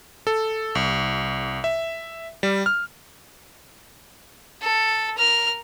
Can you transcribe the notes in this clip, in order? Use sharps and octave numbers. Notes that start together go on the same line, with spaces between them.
A4
C2
E5
G3
F6
A4
A#4 F6